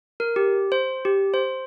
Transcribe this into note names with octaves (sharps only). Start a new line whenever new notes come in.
A#4
G4
C5
G4
C5